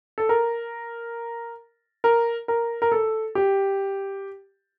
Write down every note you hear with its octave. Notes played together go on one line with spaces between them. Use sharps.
A4
A#4
A#4
A#4
A#4
A4
G4